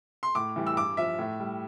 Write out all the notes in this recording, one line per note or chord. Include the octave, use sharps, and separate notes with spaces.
C6
A2 D6
E3 G3
E6
G2 D6
F3 E5
A2
G3